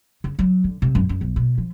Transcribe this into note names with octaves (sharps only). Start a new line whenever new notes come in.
C#3
F#3
D3
C3
F#2
F#2
B1
B2
F3